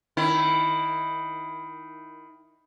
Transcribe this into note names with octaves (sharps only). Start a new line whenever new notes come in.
D#3 E4